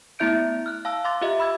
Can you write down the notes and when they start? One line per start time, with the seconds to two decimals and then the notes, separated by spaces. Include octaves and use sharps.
0.19 A3 B3 E4 E5 G6 D7
0.66 F6 F#6
0.85 F5 A5 E6
1.04 F5 C6 D6 A6
1.21 F4 G4 D#5 E5
1.40 B5 E6 G#6